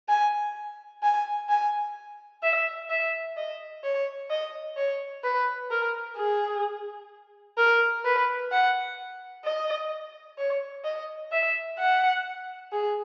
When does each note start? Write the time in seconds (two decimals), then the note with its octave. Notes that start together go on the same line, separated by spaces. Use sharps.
0.09 G#5
1.03 G#5
1.49 G#5
2.43 E5
2.90 E5
3.36 D#5
3.84 C#5
4.30 D#5
4.77 C#5
5.24 B4
5.71 A#4
6.17 G#4
7.57 A#4
8.05 B4
8.51 F#5
9.44 D#5
10.38 C#5
10.85 D#5
11.32 E5
11.79 F#5
12.72 G#4